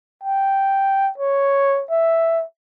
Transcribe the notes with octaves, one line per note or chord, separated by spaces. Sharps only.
G5
C#5
E5